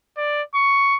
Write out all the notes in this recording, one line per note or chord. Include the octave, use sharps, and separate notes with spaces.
D5
C#6